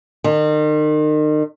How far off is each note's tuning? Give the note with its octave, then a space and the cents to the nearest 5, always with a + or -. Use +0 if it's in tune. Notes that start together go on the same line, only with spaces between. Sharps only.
D#3 -35